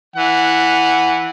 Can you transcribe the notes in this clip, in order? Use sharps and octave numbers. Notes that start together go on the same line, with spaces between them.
E3 F#5